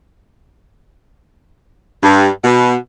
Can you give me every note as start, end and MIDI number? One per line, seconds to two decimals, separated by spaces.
2.03 2.28 43
2.44 2.75 47